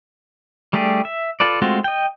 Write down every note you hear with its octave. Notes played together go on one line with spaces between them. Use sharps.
G3 A3 D4 G4 G#4
E5
F4 A4 B4 D5
G#3 A3 C4 F4 F#4
D#5 G5